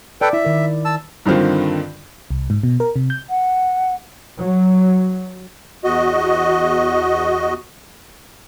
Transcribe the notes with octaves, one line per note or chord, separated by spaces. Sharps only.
A4 B4 D5 G5
E4 E5
D#3 A#4
A5 E6
G2 D3 D#3 C4 F4
C2
G#2
B2
A#4
C3
G6
F#5
F#3
E2 F#4 D#5